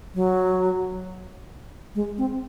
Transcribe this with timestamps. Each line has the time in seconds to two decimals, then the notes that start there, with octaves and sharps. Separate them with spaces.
0.15 F#3
1.95 G#3
2.18 C4